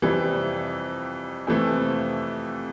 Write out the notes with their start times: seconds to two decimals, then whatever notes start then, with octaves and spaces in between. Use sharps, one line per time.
0.02 F2 C3 E3 G3
1.47 F2 C3 E3 A3